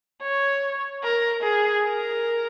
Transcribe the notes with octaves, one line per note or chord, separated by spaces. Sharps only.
C#5
A#4
G#4
A#4